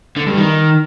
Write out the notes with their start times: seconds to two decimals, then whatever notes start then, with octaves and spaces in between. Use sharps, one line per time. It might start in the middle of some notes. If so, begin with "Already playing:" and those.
0.16 D3
0.27 G2
0.37 D#3